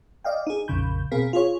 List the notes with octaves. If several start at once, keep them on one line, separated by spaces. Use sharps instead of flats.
D5 D#5 F5 G5
D#4 G#4
A#1 F2 C#3 B5 G6
B2 C4 G#4 A#4 F5 B6
F4 G#4 C#5